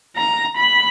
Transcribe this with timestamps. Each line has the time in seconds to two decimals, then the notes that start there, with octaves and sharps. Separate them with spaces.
0.17 A#5
0.57 B5